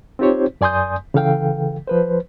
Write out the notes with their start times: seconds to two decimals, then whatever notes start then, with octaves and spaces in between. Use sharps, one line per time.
0.19 C4 D#4 F4 G4 C5 C#5
0.61 F#2 D5 G#5 C6 D#6 G6
1.14 C#3 E3 A4 F5 G5
1.88 F3 B4 C5